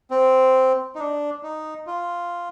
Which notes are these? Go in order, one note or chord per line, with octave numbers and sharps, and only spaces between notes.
C4
D#4
D4
D#4
F4